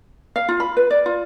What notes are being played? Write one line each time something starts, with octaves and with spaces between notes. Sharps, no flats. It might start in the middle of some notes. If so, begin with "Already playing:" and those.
F5
F4
B5
B4
D5
F4